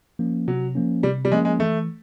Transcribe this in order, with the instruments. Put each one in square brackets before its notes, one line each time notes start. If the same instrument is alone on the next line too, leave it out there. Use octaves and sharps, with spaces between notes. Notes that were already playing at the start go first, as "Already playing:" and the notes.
[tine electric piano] F3 A#3 C#4
[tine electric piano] C3 [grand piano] F#3
[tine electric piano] F3 A#3 C#4
[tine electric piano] C3 [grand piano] G3
[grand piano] G3
[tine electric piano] F3 A#3 C#4 [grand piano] G#3
[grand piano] G#3
[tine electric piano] E3 [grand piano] A3